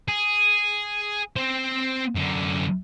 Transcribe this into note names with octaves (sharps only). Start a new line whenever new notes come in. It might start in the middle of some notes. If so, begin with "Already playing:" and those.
G#4
C4 C5
F#2 D3